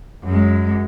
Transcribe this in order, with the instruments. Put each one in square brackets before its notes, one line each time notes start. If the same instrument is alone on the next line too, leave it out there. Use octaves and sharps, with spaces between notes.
[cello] F#2 G#3